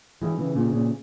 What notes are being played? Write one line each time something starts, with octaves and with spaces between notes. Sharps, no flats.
E3 G#3
C#3 E3
A#2 C#3
A#2 C#3